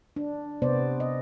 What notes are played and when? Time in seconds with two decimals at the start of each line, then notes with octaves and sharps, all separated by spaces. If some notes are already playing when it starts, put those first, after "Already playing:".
0.16 D4
0.62 C3 B3 C5 D5
1.00 D#5